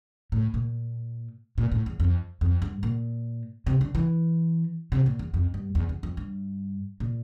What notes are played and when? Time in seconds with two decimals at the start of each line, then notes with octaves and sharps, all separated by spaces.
0.32 A2
0.54 A#2
1.58 A#2
1.72 A2
1.86 E2
2.00 F2
2.41 F2
2.62 G2
2.83 A#2
3.67 C3
3.81 D3
3.95 E3
4.92 C3
5.06 A#2
5.19 E2
5.34 F2
5.54 G2
5.75 E2
5.89 E2
6.03 F2
6.17 G2
7.00 A#2